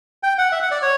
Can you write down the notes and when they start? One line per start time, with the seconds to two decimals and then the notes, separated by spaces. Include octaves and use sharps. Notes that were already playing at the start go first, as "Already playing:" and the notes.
0.23 G5
0.38 F#5
0.52 E5
0.62 F#5
0.71 D5
0.82 C#5